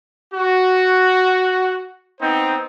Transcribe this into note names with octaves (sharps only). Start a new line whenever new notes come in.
F#4
B3 C4 D#4 C5